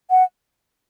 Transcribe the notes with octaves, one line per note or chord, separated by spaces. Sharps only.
F#5